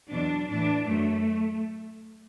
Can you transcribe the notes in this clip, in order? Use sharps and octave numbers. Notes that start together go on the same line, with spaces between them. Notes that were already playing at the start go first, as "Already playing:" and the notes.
E2 B2 F#3 D4
A2 E3 D4
F#2 F#3 A3